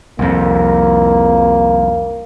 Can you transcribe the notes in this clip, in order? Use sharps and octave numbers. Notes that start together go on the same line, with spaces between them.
C2 F2 A#3